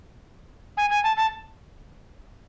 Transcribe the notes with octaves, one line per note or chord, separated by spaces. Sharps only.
G#5
G#5
A5
A5